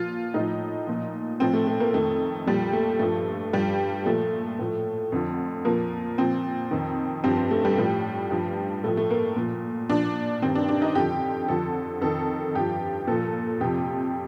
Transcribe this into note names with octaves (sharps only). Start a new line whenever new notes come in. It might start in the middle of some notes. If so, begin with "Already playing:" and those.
Already playing: A#2 F3 F4
A2 F3 D#4
A#2 F3
A2 F3 C4
A3
A3
A#3
F2 D#3 A3
A#2 F3 G3
A3
G2 F3 A3
G2 F3 G3
A#2 F3 A3
A2 F3
F2 D3 F3
A#2 F3 A#3
A#2 F3 C4
F2 D#3
G2 F3 C4
C4
A3
G3
A2 F3
G2 F3
A2 F3 A3
A3
A#3
A#2 F3
A#2 F3 D4
G2 D#3 C4
D4
D4
D#4
F2 D3 F3 G4
F2 D3 F3 A4
F2 D#3 A4
G2 F3 G4
A#2 F3 A4
F2 C3 F3 G4